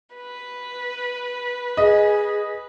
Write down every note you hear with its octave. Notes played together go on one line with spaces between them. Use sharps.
B4
G#4 D#5